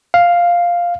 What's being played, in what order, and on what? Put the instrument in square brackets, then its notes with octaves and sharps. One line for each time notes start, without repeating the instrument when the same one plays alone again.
[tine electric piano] F5